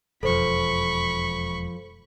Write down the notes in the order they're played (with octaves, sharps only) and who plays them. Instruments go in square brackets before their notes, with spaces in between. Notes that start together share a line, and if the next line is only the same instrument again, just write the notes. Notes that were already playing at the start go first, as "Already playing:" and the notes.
[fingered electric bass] E1 [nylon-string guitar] F2 F3 [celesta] A4 C5 [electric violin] B5 C#6